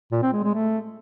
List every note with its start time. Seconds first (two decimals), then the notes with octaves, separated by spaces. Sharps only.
0.12 A#2
0.22 C4
0.33 G#3
0.43 G#3
0.54 A3